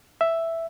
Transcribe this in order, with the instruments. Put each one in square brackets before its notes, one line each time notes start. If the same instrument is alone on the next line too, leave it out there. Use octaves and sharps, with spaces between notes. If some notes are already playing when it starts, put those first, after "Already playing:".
[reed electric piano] E5